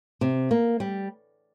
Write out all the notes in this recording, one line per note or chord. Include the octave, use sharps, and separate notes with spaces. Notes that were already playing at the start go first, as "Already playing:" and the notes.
C3
A#3
G3